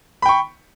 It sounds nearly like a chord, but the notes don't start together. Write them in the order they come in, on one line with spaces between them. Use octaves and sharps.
B5 G5 C#6